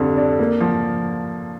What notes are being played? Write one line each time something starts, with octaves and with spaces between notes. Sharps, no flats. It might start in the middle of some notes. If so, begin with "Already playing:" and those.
Already playing: F2 D3 G3
D4
A#3
F3